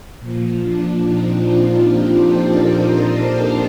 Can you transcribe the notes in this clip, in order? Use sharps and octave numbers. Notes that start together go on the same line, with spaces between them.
A#2 F3
D4
C4 D#4
D4 F4
D#4 G4
A4 C5
A#4 D5
C5 D#5
F5 A5